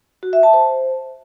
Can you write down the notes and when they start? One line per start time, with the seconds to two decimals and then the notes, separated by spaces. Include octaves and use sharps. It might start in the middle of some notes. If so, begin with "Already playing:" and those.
0.23 F#4
0.33 E5
0.43 A5
0.53 C5